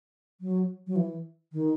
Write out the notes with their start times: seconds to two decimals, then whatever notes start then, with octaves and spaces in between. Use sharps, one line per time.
0.41 F#3
0.87 F#3
0.96 E3
1.53 D#3